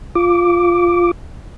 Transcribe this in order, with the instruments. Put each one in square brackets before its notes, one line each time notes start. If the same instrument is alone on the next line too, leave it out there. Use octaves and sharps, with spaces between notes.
[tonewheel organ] F4 D6